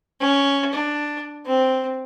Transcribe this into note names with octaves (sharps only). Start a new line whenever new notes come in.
C#4
D4
C4